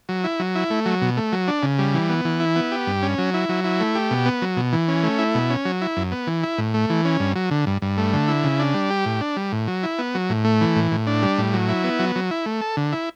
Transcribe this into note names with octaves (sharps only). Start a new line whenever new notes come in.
F#3
E4
F#3
E4
A3
F#3
B2
A3
F#3
D4
C#3
G3
E3
B3
E3
E4
B3
G4
G2
C#4
F#3
E4
F#3
E4
A3
G4
B2
B3
F#3
B2
E3
C#4
A3
E4
B2
C#4
F#3
E4
F#2
B3
E3
E4
A2
A3
E3
C#4
G2
F#3
D3
G2
G2
A3
D3
E4
C#3
D4
G3
G4
A2
D4
G3
A2
F#3
E4
B3
F#3
A2
A3
E3
A2
A2
D4
G3
A2
F#3
E4
B3
F#3
F#3
E4
A3
A4
D3
E4